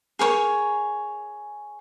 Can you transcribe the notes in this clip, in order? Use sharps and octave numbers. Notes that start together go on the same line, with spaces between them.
G#4 A#4 C5 C#5